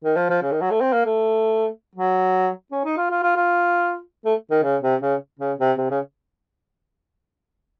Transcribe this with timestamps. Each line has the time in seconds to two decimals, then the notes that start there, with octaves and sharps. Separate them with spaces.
0.04 D#3
0.16 F3
0.29 F3
0.42 C#3
0.52 D#3
0.61 F#3
0.71 A3
0.81 C4
0.93 A#3
1.05 A3
1.95 F#3
2.72 C#4
2.84 D#4
2.97 F4
3.10 F4
3.23 F4
3.36 F4
4.25 A3
4.51 D#3
4.63 C#3
4.82 C3
5.01 C#3
5.39 C#3
5.59 C3
5.78 C3
5.90 C#3